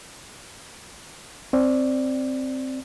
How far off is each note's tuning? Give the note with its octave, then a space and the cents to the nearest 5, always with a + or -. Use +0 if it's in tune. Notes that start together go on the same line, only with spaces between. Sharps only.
C4 +0 D5 +0